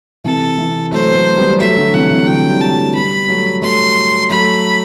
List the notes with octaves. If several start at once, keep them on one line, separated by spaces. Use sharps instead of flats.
C3 E3 A4
C3 E3
F#3 A3 C5
B3
F#3 A3
G3 B3
G3
F#3 A3 E5
D3 F#3
C3 E3 F#5
C3 E3
D3 F#3 G5
E3 G3
A5
F#3 A3
G3 B3 B5
F#3 A3
F#3 A3 C6
F#3 A3 B5